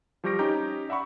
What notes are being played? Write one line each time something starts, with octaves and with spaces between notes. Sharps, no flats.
F3 G3 G4 C#6 A#6 D7
C#4 D#4 G4 A#5 G6
D5 E5 F#5 B5 C#6